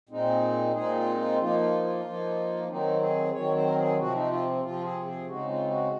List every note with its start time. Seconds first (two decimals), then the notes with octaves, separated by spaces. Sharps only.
0.09 A#2 G#3 C4 D#4
0.73 A#2 G#3 C4 D#4 G#4
0.95 F4
1.17 F4
1.39 F3 A#3 D#4 F4
1.60 F4
1.83 F4
2.04 F3 A#3 D#4
2.68 D#3 F#3 C4 D#4
3.01 G#4
3.33 D#3 F#3 C4 C#5
3.55 C5
3.67 A#4
3.76 G#4
3.98 C3 F3 C4 F#4
4.14 D#4
4.30 F4
4.63 C3 F3 C4 F4
4.84 G#4
5.06 G#4
5.27 C#3 G#3 C4 D#4 F#4
5.49 F4
5.70 F#4